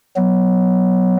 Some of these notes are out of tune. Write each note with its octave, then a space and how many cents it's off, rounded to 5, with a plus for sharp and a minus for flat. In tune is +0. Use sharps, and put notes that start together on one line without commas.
F#3 +0 B3 +0